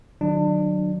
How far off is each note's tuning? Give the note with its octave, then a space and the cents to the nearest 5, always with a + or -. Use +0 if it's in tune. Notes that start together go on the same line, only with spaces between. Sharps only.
D#3 -45 F#3 +0 D4 +30